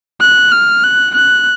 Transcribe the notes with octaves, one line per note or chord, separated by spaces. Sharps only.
F#6
F6
F#6
F#6